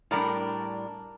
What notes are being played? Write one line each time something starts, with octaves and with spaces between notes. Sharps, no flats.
A2 G3 D4 A#4 D5